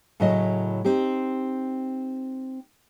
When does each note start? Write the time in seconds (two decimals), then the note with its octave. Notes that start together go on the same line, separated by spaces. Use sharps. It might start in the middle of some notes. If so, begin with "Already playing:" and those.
0.20 A2 C#3 F#3 A3 E4 D#5
0.85 C4 D#4 G4